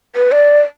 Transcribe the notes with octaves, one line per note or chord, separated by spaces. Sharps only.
B4
D5